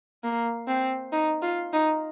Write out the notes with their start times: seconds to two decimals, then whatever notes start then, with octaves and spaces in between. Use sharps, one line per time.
0.23 A#3
0.68 C4
1.12 D#4
1.42 F4
1.73 D#4